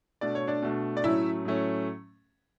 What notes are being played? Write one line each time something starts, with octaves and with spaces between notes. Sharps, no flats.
B2 A3 D4 D5
C#5
D4 D5
B2 A3 D4
D5
A2 F#3 A3 C#4 E4 E5
A2 F#3 A3 C#4